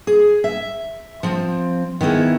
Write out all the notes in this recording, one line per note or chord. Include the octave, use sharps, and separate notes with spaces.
G#4
E5
F3 C4
D#3 B3 E4 G#4